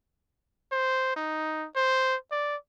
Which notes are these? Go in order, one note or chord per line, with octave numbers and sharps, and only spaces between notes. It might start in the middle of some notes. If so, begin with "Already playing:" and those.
C5
D#4
C5
D5